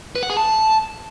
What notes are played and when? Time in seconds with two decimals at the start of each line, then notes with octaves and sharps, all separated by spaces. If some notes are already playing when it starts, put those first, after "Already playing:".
0.15 B4
0.23 F#5
0.30 G#4
0.37 A5